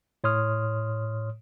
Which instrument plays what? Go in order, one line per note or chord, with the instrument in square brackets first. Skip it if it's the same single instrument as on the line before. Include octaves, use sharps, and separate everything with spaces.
[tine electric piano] A2 C#5 C6 D#6 F6